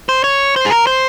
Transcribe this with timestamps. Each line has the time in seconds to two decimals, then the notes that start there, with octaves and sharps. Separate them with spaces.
0.09 C5
0.24 C#5
0.56 C5
0.66 G#4
0.71 A#4
0.87 C5